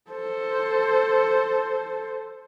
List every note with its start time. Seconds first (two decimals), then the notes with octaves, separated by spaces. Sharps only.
0.11 A4 C5